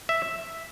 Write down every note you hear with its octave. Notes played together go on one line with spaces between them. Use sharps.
E5